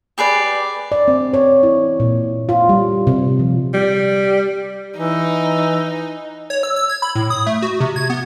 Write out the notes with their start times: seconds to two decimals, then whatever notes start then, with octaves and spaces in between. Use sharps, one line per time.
0.18 G4 G#4 B4 D5
0.92 D5
1.08 C4
1.34 C#5
1.63 E4
2.00 A#2
2.49 F4
2.69 G3
3.07 C3
3.39 F3
3.74 G3
4.97 E3 D#4
6.50 C#5
6.63 E6
6.76 E6
6.89 G#6
7.02 B5
7.15 A2
7.30 D#6
7.47 A3
7.62 F#4
7.80 C3
7.96 G#6
8.10 B3